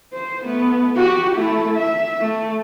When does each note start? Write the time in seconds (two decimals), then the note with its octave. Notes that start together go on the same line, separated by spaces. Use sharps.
0.13 C5
0.45 A3 B3
0.96 F#4 G4
1.36 A3 E4
1.76 E5
2.20 A3